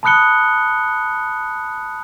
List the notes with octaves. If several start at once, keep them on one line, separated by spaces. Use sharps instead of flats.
A5 B5 D#6 F#6 C#7 G7